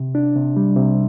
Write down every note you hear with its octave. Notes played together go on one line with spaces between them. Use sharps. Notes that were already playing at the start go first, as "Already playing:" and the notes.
Already playing: C3
D4
C3
G3
C3